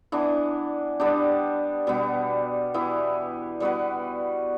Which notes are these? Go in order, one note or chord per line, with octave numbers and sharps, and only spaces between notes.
E3 B3 D4
G3 B3 D4 G4
B2 G3 B3
E3 B3 E4
G3 B3 F#4 B4